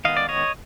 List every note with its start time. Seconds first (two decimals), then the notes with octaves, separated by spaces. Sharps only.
0.05 D#3 G#3 B3 D#5 F5
0.17 D5
0.29 C#5 D#5